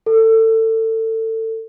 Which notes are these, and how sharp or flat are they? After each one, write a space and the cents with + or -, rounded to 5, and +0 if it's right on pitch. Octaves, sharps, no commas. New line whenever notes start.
A4 +25